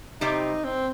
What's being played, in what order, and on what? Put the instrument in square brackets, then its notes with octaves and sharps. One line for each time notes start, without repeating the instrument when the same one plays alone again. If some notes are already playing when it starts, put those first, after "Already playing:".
[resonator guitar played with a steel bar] C3 G3 C4 [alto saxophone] D#4
[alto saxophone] C4